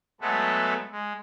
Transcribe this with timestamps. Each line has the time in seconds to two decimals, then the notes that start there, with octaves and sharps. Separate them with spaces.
0.21 F#3 G#3 A3 B3 A4
0.92 G#3